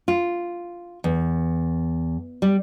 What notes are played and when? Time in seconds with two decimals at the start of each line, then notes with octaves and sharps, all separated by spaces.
0.08 F4
1.04 E2
2.42 G3